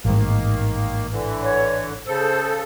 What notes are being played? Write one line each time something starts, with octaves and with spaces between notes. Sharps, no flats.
A1 G#2 D#3 A#3
D3 E3
C#5
C#3 A4 C5